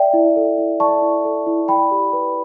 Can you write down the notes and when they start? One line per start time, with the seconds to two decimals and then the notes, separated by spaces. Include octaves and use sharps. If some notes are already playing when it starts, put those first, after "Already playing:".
Already playing: D5 E5 G5
0.13 E4
0.36 A4
0.58 E4
0.80 D5 A5 C#6
1.02 E4
1.25 A4
1.46 E4
1.68 D5 G5 B5
1.91 G4
2.13 B4